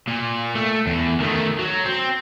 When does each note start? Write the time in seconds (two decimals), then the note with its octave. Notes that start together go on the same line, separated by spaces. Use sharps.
0.08 A#2
0.55 A3
0.87 E2
1.20 D#3 A3
1.59 F#3
1.85 C4